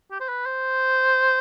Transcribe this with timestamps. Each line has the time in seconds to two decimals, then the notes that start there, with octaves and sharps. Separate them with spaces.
0.11 G4
0.21 C5
0.29 B4
0.46 C5